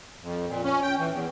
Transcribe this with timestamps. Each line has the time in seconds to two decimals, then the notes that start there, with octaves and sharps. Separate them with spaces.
0.22 F2
0.48 A#2
0.64 C#4
0.83 G5
0.99 E3
1.12 E2